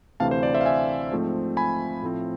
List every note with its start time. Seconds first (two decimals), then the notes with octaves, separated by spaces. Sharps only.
0.20 D2 C3 E3 A3 C4 F5 A5
0.31 C5
0.43 D5
0.54 C5 E5
0.61 F5
0.66 E5 G#5
1.11 G#2 F3 A3 C4
1.57 G#5 B5
2.02 A2 F3 A3 C4